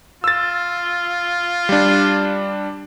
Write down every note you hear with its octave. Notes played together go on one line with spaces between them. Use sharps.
F4 E6 A6
G3 D4